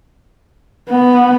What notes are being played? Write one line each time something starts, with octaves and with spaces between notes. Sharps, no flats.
B3